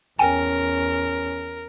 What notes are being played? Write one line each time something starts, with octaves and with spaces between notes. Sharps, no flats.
E2 C#4 A#4 G5 G#5